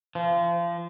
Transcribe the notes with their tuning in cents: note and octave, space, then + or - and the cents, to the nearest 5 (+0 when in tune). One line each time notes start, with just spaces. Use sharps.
F3 -30